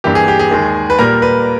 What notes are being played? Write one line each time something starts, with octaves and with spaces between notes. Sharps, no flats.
G2 E3 A#3 G4
G#4
G4
G#4
D#2 D#3 G#3
B4
A#2 G3 A#3 A#4
B4